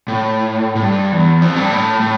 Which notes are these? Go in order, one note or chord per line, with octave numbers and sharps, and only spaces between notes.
A2
A2
G2
E2
F2
G2
A2
A2